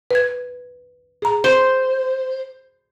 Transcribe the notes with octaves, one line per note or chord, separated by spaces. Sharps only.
B4 G#6
G#4 A#5
C5